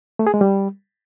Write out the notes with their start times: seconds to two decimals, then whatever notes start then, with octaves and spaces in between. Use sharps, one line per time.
0.19 A3
0.27 G#4
0.34 G#3
0.41 G3